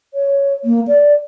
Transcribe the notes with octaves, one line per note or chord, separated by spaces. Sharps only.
C#5
A#3
D5